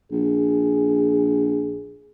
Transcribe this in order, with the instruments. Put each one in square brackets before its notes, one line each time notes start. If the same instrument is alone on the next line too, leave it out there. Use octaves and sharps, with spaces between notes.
[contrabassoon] A#1 [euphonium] G#4